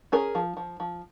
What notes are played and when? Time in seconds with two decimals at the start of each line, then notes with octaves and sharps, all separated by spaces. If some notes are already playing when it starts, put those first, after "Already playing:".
0.12 C#4 G#4 A#4
0.35 F3
0.57 F3
0.80 F3